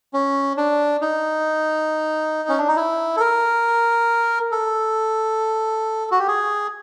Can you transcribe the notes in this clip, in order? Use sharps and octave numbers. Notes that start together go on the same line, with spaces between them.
C#4
D4
D#4
C#4
D4
D#4
E4
A4
A#4
A4
F#4
G4
G#4